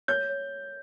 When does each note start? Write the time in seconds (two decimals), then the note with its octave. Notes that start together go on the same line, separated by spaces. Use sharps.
0.08 C#5 G6
0.29 C#5